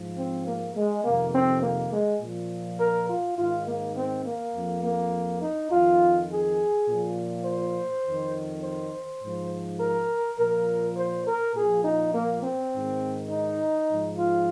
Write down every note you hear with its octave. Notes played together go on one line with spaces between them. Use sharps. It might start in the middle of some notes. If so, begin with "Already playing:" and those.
Already playing: G#2 F3
C4
A#3
G#3
F2 C3 D#3 A#3
C4
A#3
G#3
A#2 F3
A#4
F4
G#2 D#3 F4
A#3
C4
A#3
F2 F3
A#3
D#4
F2 D#3 F4
G#4
A#2 F3
C5
F2 D#3
C5
G#2 F3
A#4
A#2 F3 A#4
C5
A#4
A#2 F3 G#4
D#4
A#3
C4
G#2 D#3
D#4
G#2 F3
F4